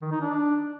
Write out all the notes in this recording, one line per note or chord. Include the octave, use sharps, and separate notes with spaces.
D#3
D#4
D4